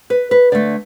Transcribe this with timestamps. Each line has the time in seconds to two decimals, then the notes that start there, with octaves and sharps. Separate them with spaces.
0.10 B4
0.31 B4
0.52 D3 A3 D5